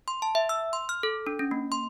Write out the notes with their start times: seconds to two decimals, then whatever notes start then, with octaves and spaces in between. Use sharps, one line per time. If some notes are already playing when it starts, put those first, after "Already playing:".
0.08 C6
0.22 A5
0.35 E5
0.49 E6
0.73 C6
0.89 F6
1.03 A4
1.27 D4
1.39 C#4
1.51 A#3
1.72 C6